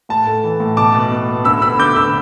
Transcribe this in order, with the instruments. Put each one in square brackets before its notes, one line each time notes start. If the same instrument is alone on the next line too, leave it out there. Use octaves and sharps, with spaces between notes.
[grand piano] A2 A5
A3
E3
A2
B2 A5 D6
B2
B3
B3
D2 B5 E6
B3 B5 E6
D3 D6 G6
D2 B5 E6